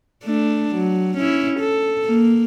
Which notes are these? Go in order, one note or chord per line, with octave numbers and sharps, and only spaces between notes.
A3 D4
F#3
C#4 E4
A4
A#3